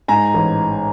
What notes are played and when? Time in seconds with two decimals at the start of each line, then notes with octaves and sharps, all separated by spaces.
0.08 G#2 G#5 A#5
0.34 A1